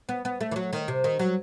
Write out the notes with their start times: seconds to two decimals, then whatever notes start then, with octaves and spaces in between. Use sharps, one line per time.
0.09 B3
0.25 B3
0.41 A3
0.51 E3
0.56 F#3
0.73 D#3
0.88 C3
1.04 D#3
1.19 F#3